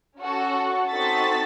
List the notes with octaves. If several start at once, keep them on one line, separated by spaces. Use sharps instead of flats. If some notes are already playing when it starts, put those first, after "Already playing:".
C#4 F#4 A4
C4 D#4 F#4 A4 A6 B6